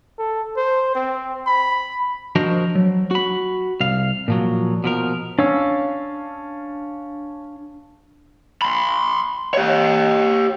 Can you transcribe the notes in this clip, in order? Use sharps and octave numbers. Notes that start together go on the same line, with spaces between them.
A4
C5
C4
B5
F3 D4 F#4 A#4 C5 D#5
F#3
F#4 B5
C2 F5
A#2 F3 F#3
B2 F3 A#4
C#4 D4 F5 E6
B5 C6
G4 C#5